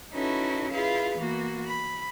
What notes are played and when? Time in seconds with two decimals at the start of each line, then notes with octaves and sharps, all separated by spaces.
0.13 C#4 D#4 E4 F#4 A4 B4
0.71 E4 F4 G#4 B4 F5
1.17 E3 A#3 B3 F#4
1.66 B5